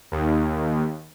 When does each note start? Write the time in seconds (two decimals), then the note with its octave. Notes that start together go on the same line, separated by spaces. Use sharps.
0.12 D#2